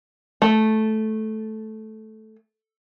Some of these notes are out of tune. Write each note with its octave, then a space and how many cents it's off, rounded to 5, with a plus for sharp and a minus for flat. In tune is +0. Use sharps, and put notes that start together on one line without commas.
A3 -10